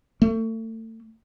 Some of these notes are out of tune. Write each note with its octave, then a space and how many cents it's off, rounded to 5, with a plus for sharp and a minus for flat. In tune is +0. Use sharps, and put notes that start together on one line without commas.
A3 +30